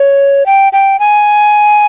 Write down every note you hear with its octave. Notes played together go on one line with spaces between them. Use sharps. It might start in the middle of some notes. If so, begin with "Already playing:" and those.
Already playing: C#5
G5
G5
G#5